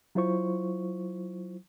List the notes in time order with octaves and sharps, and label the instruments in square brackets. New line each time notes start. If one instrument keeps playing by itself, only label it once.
[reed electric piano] F#3 E4 F4 C5 C#6